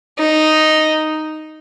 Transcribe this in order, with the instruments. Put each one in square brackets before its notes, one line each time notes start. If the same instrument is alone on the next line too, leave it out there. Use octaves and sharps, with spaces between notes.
[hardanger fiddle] D#4